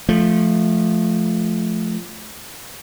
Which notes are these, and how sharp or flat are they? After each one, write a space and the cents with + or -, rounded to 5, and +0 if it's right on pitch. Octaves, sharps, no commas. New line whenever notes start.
F3 +0 A3 -15